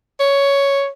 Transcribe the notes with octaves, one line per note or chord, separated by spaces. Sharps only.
C#5